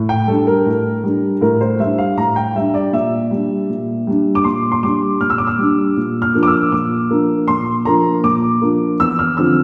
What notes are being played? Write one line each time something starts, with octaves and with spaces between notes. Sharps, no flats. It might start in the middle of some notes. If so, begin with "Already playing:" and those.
Already playing: A2
G5
G3 D4 A4
A#4
A2
G3 D4
A2 A#4
C5
G3 D4 E5
F5
A2 A#5
G5
G3 D4 E5
D5
A#2 E5
G3 D4
A#2
G3 D4
D6
A#2 C6
C6
G3 D4 D6
A#2 F6
E6
D6
E6
G3 D4
A#2
F6
F3 A#3 D4
D6
E6
A#2 D6
F3 A#3 D4
A#2 C6
F3 A#3 D4 A#5
A#2 D6
F3 A#3 D4
E2 E6
F6
D3 F3 C4 E6